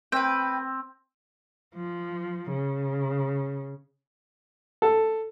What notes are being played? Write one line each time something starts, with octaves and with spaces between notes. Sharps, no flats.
C4 B4 G5
F3
C#3
A4